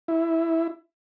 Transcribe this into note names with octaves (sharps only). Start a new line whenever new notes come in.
E4